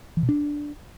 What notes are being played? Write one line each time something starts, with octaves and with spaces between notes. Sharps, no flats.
E3
B2
D4